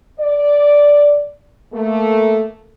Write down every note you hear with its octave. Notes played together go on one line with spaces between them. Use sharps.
D5
A3 A#3